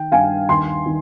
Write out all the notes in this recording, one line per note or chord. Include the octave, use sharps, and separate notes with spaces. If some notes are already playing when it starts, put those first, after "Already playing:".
Already playing: D#3 G5
G2 F5 G#5
D#2 G#5 C6
D#3